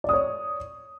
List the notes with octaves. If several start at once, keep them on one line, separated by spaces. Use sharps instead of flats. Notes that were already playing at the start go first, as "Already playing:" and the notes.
C#5 D5 D#6